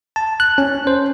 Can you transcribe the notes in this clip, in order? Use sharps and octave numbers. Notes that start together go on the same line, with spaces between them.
A5
F#6
C#4
C5